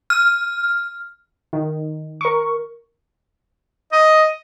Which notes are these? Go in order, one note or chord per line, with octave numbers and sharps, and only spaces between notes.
F6
D#3
A#4 C#6
D#5